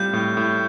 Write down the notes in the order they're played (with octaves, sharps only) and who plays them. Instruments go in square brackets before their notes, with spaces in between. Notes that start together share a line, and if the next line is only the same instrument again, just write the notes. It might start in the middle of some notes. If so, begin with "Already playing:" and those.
Already playing: [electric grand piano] A2 G3 C4 F4 [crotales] G6
[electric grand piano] A2
A2